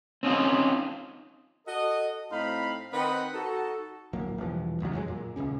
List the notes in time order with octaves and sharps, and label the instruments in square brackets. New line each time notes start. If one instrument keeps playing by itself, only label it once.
[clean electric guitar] C4 C#4 D#4 F4
[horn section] F#4 A4 D#5
A2 C4 D#4 F5 B5
D#3 C4 B4 D#5 F#5
D#4 F#4 A4
[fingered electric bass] D1 A#1 F#3 A#3
E1 E3 F3 G3
A1 D#2 C#3 F#3
F2 F#3 G#3
A#2
D#1 G#1 C#2 C#4